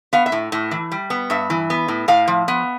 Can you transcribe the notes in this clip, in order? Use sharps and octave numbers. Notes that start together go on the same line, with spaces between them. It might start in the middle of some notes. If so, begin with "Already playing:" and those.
B3 F5
E5
A2
A2
E3
G3
B3
G2 E5
E3
B3
A2
A2 F5
F3
B3